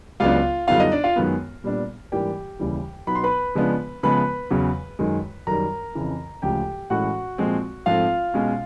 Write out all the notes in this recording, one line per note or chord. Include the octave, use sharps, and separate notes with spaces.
C#2 C#3 F#3 B3 D4 F4 F5
F#2 D3 G3 B3 D#4 F4 F5
D#4 D#5
D4 D5
F4 F5
F#2 D#3 G#3 B3
A#2 G3 B3 D4
G#2 E3 G3 A#3 D4 G4 G5
D#2 C#3 E3 G3
B2 F#3 B3 D#4 B5
C6
B4 B5
C#3 F3 G#3 B3 D4
C#3 F3 G#3 B3 B4 B5
E2 C#3 F#3
F#2 D#3 G#3
F#2 D#3 G3 A#4 A#5
F2 C#3 E3
D2 C#3 F3 G#3 G4 G5
A2 E3 G#3 C#4 F#4 F#5
A#2 F3 G#3 C4
G#2 F3 A3 C4 F4 F5
B2 G#3 C#4